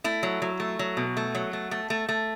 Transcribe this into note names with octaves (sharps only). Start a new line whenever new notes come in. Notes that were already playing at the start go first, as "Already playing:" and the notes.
A3 E4
F#3
F#3
A3
F#3
B2
A3
F#3
A3
A3
A3
A3